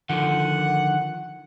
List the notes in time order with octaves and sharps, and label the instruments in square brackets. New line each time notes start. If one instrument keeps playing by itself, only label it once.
[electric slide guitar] D3 D#3 F3 [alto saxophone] F#5